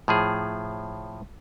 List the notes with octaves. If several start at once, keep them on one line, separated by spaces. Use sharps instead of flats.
A2 F3 G#4